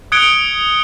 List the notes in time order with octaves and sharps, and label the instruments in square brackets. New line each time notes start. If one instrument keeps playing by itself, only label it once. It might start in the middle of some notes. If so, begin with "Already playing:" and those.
[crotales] D#6 F#6 G#6 C#7 D7 G7